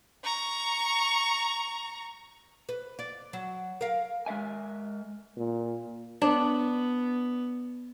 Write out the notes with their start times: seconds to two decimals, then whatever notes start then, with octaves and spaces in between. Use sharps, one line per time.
0.24 A#5 C#6
2.69 B4
2.99 D5
3.33 F#3
3.81 A#4 F5
4.26 G#3 A#4 E5 G#5
5.37 A#2
6.22 B3 D4